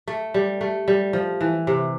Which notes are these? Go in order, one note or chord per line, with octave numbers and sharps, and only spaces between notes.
A3
G3
A3
G3
F3
E3
C3